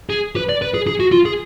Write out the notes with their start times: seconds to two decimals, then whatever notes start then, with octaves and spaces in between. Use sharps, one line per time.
0.10 G#4
0.36 B4
0.49 D5
0.62 B4
0.74 G#4
0.87 G#4
1.00 F#4
1.12 F4
1.26 G#4